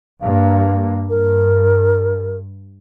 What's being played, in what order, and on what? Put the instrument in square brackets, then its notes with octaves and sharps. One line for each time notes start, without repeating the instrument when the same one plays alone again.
[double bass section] G2 A#3 [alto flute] F5
[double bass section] G2 [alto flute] A#4